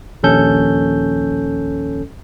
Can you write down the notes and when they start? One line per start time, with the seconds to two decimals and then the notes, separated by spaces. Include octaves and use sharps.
0.23 A#1 D#2 C#4 A4 G6